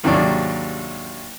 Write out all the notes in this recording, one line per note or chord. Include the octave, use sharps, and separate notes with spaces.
D#2 G#2 C3 F#3 D4 D5